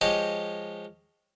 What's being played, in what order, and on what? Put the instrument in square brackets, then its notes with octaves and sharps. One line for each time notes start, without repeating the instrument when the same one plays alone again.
[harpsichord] F3 G#3 G4 C#5 D#5